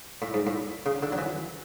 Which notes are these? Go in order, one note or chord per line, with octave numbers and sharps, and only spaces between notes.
A2
G#2
A2
C#3
D3
F#3
E3